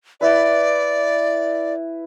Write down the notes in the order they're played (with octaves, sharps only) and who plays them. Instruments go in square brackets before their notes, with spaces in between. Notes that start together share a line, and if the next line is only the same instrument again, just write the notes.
[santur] E4 B4 [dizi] D5